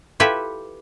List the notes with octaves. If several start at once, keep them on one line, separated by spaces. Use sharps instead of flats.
E4 F4 G4 A4 B4 E5